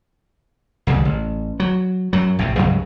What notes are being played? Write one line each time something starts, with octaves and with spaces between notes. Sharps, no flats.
C2 F2 D3 G#3
A1
F#3
F#2 F#3
A#1 A2 C3
C#2 G2 F#3 G3